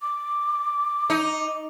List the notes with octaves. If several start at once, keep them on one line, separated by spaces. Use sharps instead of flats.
D6
D#4